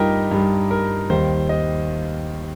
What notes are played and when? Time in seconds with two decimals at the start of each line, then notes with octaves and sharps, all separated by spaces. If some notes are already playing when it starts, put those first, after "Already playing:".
Already playing: G2 G3 D#4 F4 G4 A#4 D#5
0.31 G2 G3
0.71 A#4
1.10 D#2 D#3 G3 C5
1.49 D#5